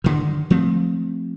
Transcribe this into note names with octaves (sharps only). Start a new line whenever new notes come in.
G2 D3 D#3
F3 A3 C4